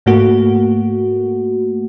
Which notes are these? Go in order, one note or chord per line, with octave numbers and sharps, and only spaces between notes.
G#2 A3 A#3 F#4